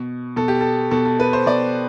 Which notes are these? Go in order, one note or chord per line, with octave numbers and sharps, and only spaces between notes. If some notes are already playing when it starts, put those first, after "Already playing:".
Already playing: B2
B2 A4
G4
A4
B2 A4
A4
B4
C5
B2 D5